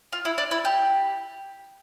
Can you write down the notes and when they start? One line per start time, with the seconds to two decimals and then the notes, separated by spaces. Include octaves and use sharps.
0.12 F4
0.25 E4
0.38 D4
0.51 E4
0.65 G4